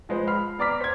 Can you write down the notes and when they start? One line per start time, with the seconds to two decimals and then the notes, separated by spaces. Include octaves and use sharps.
0.09 F3 G#3 B4 C5
0.28 B5 F6 C7
0.59 B3 D5 A#5 D6 F6 B6
0.81 C5 G#6